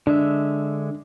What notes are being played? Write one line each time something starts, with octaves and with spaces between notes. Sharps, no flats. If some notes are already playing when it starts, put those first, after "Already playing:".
D3 G#3 D4 E5